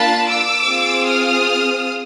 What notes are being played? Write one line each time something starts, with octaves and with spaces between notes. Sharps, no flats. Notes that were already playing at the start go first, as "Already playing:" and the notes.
Already playing: A#3 D4 F4 A5 B5
D6 E6
C4 F4 G#4
D#6 F6